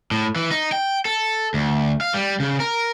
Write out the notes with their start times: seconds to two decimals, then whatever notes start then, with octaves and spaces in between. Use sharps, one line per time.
0.11 A2
0.36 E3
0.51 D#4
0.72 G5
1.05 A4
1.54 D2
2.01 F5
2.14 G3
2.40 C#3
2.60 A#4